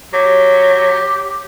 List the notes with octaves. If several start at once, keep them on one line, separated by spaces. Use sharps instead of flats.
F#3 G4